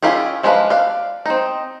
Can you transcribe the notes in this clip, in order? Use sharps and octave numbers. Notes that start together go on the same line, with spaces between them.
C#4 E4 F4 G4 G#4
F3 G#3 D4 B4 F5
D5 F5
C4 D#4